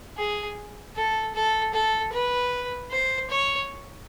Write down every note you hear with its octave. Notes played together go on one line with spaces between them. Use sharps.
G#4
A4
A4
A4
B4
C5
C#5